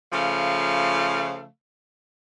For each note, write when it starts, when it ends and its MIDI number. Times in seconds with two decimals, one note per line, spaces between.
0.12 1.46 49
0.12 1.46 53
0.12 1.46 57
0.12 1.46 77